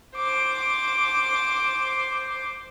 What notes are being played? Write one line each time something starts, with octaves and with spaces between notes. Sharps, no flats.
C5 D6